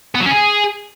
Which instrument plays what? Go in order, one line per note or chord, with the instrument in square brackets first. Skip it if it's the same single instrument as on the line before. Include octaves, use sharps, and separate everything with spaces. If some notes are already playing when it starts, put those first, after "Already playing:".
[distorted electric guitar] B3
F#3
C#4
G#4